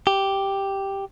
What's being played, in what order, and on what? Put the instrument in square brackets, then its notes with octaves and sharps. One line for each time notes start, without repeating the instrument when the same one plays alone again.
[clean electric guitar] G4